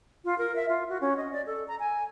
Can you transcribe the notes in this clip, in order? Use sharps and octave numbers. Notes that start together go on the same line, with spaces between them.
F4
A#4
E5
F4
F#4
C#4
D#5
D5
A4
A#5
G#5